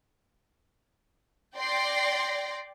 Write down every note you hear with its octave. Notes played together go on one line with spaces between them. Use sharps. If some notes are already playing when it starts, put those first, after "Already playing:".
D5 G5 C6 A#6